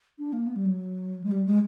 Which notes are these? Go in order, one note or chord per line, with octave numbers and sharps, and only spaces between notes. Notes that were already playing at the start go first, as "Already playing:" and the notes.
D4
A#3
B3
G3
F#3
G#3
G3
G#3